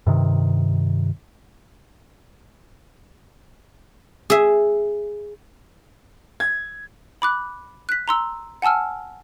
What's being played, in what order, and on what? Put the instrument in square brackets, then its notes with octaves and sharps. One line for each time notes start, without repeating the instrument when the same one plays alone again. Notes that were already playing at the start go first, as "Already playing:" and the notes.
[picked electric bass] G2 C3 D#3
[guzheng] G#4 E5
[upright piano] G#6
[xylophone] B5 D6 F#6
F#6 B6
A#5 C6 E6
F#5 G#5 A5 E6 F6